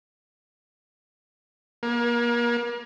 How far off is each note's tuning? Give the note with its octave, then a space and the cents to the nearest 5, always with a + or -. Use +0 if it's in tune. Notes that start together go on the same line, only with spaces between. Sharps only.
A#3 +35